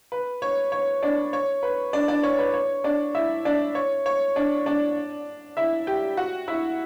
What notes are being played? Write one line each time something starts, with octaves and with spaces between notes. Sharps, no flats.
B4
C#5
C#5
D4 D5
C#5
B4
D4 D5
D4 D5
C#5
B4
C#5
D4 D5
E4 E5
D4 D5
C#5
C#5
D4 D5
D4 D5
E4 E5
G4 G5
F#4 F#5
E4 E5